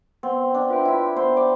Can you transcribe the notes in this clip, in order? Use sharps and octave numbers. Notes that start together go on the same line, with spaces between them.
B3 C4
D4
F4 B4 E5 G5
E4
B3 C5
D5